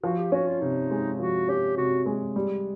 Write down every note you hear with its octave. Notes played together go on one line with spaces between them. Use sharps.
F3 F#4
G4
C#4 F#4
F4
C3 D#4
G#3
F3 F#4
C#4 G4
C3 F#4
G#3
G3